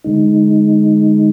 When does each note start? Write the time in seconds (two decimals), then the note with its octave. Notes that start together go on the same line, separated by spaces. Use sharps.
0.04 D3 G#3 D#4